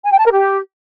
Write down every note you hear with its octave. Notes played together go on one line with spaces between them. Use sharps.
G#5
G5
A5
A#4
G4